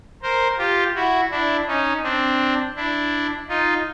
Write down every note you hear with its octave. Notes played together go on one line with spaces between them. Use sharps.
A#4 C5
F4 G4
E4 F#4
D4 E4
C#4 D#4
C4 D4
D4 E4
D#4 F4